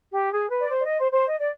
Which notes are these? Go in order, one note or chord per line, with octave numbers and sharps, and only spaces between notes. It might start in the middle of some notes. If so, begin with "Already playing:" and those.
G4
G#4
B4
D5
C5
D5
D#5
C5
C5
D#5
D5